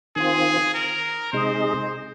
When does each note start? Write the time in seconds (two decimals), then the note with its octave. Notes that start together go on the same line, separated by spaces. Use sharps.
0.16 D#3 C4 F4 G#4
0.74 A#4
1.32 C3 G#3 D#4 G#4 C5 D#5